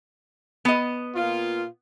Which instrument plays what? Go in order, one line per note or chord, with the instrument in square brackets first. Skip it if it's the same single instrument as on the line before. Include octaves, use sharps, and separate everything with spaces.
[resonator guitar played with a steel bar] B3 D#5
[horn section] A#2 F4